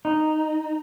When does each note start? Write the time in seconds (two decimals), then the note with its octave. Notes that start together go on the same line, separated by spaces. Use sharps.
0.05 D#4